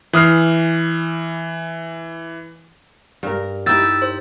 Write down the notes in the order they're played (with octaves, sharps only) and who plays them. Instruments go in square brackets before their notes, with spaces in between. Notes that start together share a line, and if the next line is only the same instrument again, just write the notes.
[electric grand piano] E3 D#6 F6 C7
[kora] G2 A#4
[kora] D#4 E4 G4 [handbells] E6 A6
[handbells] C5